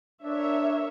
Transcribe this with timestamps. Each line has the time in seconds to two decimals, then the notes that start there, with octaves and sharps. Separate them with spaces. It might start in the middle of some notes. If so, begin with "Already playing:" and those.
0.23 D4 A#4 C#5 E5